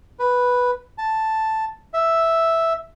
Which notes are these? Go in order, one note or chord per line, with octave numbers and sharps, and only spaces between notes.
B4
A5
E5